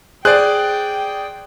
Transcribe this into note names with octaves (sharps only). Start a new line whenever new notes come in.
G#4 C5 D5 G5 F#6